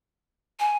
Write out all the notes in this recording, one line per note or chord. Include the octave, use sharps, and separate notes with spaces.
G#5